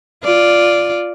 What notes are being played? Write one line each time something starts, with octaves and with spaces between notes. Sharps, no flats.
F4 D5